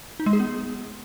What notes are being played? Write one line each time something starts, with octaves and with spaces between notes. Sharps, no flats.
D#4
G#3
G#4
B3